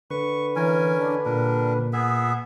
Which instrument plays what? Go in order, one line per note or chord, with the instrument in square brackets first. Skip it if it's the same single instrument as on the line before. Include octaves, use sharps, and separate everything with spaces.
[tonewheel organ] D3 B4 [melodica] C#6
[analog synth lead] E3 [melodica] C#4 A#4 G#5
[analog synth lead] D4
[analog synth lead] A#2 [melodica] G3 D4 A#4
[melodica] B3 G#4 E5